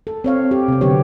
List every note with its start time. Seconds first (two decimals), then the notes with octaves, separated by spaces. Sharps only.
0.07 A4
0.24 C4 C#5 F5
0.51 G4
0.68 C3 C4
0.81 D3 F#3 B3 G4 C#5